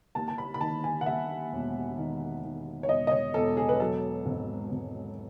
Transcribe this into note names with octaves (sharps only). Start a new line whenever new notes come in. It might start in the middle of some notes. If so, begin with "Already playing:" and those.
D#2 A5
A5
B5
B5
D#3 A5
G#5
F#5
D#2 E5
E1
D#3
D#3
C#5
E1 D#5
D#5
C#5
E1 A4
G#4
B4
F#3 A4
G#1
G#1